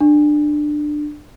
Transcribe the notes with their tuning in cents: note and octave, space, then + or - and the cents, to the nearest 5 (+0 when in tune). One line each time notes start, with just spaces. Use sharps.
D4 +20